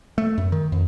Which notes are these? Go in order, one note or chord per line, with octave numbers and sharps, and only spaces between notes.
A3
F#2
D#3
F2